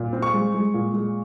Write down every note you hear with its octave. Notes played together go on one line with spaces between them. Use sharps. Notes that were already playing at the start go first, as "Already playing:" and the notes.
Already playing: A#2
C4
C#6
G#3
G#3
A#2
G#3